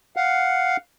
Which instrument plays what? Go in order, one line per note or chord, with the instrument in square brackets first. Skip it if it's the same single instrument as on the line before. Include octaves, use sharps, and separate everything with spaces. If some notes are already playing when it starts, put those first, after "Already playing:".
[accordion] F5 F#5